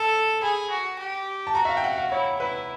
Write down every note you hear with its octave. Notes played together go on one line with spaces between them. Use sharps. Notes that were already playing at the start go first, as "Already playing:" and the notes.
Already playing: A4 A5
G#4 B5
F#4
G4
A5
F#4 A#5
E5
F5
G5
F#5
F5
E4 C#5
E4 B4